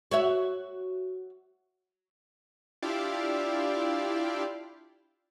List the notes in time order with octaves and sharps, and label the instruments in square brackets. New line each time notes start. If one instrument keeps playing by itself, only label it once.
[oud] F#4 C#5 E5
[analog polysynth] D4 E4 F4 G4 D5 F5